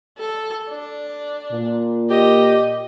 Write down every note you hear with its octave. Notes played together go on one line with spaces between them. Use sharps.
A4
D4
A#2
G4 D#5